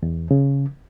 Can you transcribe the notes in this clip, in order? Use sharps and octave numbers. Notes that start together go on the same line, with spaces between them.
E2
C#3